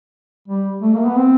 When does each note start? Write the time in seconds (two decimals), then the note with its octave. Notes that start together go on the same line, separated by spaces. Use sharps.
0.48 G3
0.82 A3
0.94 A#3
1.06 B3
1.16 C4